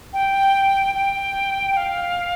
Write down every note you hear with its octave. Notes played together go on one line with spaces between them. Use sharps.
G5
G5
F5